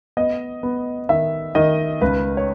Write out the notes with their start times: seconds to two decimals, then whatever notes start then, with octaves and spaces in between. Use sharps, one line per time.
0.17 B3 D#5
0.63 B3
1.09 D#3 E5
1.55 D#3 D#5
2.01 C#2 B4
2.37 C#5